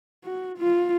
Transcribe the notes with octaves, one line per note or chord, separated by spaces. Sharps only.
F#4
F4